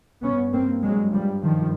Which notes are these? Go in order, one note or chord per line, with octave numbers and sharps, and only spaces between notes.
G2 B3 C#4
A#3 C4
F#3 G#3
F3 G3
D#3 F3